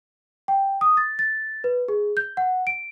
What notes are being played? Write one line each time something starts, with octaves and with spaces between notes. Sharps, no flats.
G5
D#6
A6
A6
B4
G#4
G6
F#5
D7